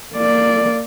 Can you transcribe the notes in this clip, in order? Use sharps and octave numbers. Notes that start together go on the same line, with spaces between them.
A#3 D5